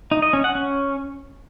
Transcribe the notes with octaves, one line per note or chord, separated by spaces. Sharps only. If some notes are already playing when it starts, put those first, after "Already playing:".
D#4
D#5
C#4
F#5
C#4